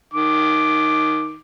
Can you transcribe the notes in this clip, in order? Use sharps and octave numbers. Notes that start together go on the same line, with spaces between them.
D#3 D6